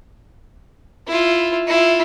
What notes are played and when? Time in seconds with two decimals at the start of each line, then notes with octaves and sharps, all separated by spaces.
1.07 E4 F4
1.67 E4 F4